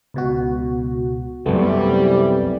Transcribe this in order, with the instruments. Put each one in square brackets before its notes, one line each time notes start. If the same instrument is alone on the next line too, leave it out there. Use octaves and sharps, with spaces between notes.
[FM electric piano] C#2 B2 F#4
[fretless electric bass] C2 F#2 [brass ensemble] C3 E3 G3 [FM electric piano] A3 B3